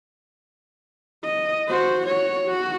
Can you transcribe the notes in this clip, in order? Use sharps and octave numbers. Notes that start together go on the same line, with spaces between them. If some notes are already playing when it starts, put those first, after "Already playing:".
D#5
F#4 C5
F#4 C#5
F#4